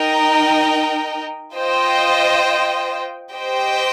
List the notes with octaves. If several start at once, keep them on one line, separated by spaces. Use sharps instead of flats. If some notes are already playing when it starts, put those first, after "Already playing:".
Already playing: D#4 A#4 D#5 G5
F4 C5 D#5 G5
G4 C5 D#5 G5